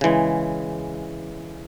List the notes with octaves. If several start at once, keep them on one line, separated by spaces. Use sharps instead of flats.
C#3 E3 G#3